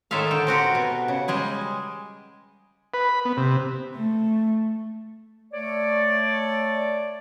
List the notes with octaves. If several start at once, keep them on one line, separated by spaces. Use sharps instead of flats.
A2 D#3 G#3 A4 E5 F5
D3 G5
C4 F#4 G4 A#4
B2
C#3
G3 G#3 G#4
B4
B5
B3
C3
A3
A3 C#5 D5